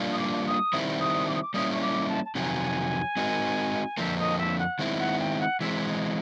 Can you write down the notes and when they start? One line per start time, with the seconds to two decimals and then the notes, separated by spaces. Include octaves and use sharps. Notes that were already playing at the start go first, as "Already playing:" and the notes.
Already playing: G3 A#3 D4 F4
0.12 D#6
0.19 D6
0.46 D#6
0.73 D#3 G3 C4 E4
1.00 D#6
1.27 D6
1.35 D#6
1.42 D6
1.54 G3 A#3 C#4 E4 D#6
1.72 C#6
1.81 D6
2.08 A5
2.25 A5
2.35 F2 C3 D#3 F#3 G#5
3.16 G#3 C4 D#4 F#4 A#4
3.97 F2 D3 F3 A#3 E5
4.18 D#5
4.38 E5
4.58 F#5
4.79 D#3 G#3 C4 E4
4.99 F#5
5.19 G5
5.40 F#5
5.60 E3 G#3 C4 E5
5.87 D#5